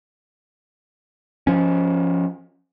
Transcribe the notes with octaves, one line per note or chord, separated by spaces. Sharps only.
F3 C#4